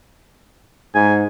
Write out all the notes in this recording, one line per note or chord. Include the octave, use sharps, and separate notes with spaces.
G#2 G#5